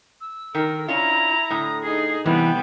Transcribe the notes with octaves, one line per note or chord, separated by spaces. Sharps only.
E6
D#3 A#4
C#4 D4 E4 F4 A#5 F7
A2 D3 D#6
D#4 G#4 C7
C3 E3 G3 B3 G5